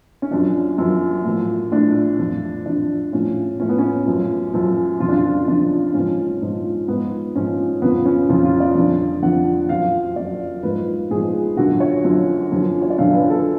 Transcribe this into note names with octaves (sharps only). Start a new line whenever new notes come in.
C#4
F#2 F3 D4
F#2 F3
A2 F3
A2 F3 D4
F2 F3
F2 F3 D4
A2 F3 C#4
A2 F3 C#4
B3
C#4
F#2 F3
F#2 F3
F2 C#3 F3 F4
D4
F4
F2 C#3 F3 D4
G#2 F3 C#4
G#2 F3
G#2 F3 B3
G#2 F3 C#4
F2 C#3 F3 B3
C#4
F2 C#3 F3 F4
F4
D5
F2 D3 F3
F2 D3 F3 F#5
F#2 F3 F5
F#2 F3 D5
G#2 F3 B4
G#2 F3 G#4
F#2 D3 F3 F#4
C#5
F#2 D3 F3
F#2 D3 F3
C#5
D5
F#2 D3 F3 F5
B4
A4